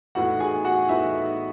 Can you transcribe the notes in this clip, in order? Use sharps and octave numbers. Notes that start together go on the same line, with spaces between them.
A2 E3 B3 D#4 F#4 F#5
G#4 G#5
F#4 F#5
A2 E3 B3 D#4 E5